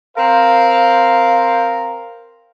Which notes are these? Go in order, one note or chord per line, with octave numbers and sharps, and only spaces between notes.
C4 A#4 C5 F5